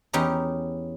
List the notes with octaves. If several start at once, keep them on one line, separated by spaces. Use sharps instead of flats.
E2 E3 C#4 D#4 G4 A#5